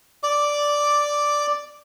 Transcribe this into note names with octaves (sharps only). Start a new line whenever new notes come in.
D5 D6